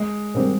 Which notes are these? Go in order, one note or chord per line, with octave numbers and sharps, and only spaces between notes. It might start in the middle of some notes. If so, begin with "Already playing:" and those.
Already playing: G#3
G#2 D#3 G3 C4